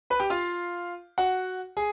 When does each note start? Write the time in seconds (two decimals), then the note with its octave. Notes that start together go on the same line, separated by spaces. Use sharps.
0.10 B4 B5
0.20 G4 G5
0.30 F4 F5
1.18 F#4 F#5
1.77 G#4 G#5